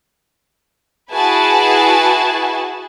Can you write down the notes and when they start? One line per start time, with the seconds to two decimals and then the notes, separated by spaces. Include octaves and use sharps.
1.12 E4 F#4 G#4 B4 G#5 A5